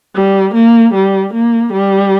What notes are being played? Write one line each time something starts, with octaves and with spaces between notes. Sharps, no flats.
G3
A#3
G3
A#3
G3